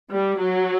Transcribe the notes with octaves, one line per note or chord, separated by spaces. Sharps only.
G3
F#3